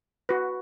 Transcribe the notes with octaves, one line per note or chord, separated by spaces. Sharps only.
F#4 B4